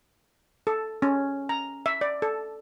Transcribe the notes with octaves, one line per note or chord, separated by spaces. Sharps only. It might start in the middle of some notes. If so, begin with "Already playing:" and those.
A4
C#4
A#5
E5
D5
A4